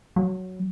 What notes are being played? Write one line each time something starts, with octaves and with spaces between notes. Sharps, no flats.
F#3